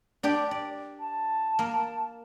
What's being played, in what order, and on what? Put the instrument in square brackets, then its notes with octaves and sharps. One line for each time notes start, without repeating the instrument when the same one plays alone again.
[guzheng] D4 G4 D5
D5
[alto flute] A5
[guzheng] A#3